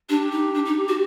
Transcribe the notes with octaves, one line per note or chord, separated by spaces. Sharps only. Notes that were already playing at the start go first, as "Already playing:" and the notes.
D4 G4
D#4
D4
D#4
F#4